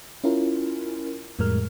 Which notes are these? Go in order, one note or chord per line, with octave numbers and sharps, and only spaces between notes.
C#4 E4 F4 A#4
F2 A2 G3 G#3 A#4 F6